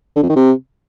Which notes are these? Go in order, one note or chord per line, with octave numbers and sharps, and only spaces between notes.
D3
F2
D#3
C3